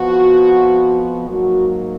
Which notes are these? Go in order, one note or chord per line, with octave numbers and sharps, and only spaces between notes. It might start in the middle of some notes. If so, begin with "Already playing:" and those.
Already playing: F2 F3 B3 F#4
G#2 F#3 A#3 F#4